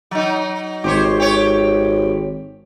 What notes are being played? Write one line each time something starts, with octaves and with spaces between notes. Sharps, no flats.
F#3 D#4
G#1 G4 C5 C#5
G4 C#5